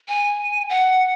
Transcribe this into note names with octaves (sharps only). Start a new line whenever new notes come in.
G#5
F#5